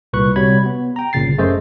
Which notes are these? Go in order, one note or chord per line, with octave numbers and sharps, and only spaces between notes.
C2 A#2 B4 C#6 F#6
C3 G3 F#4 C#5 B5 G#6
B3
G5 A#5
G1 A#2 C#3 A6 C7
F#2 A3 G#4 C5 D#5